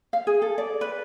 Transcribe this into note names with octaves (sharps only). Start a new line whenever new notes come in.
F5
G#4
A4
D5
B4